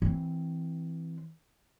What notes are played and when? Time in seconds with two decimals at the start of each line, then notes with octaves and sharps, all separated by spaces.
0.02 E3 C4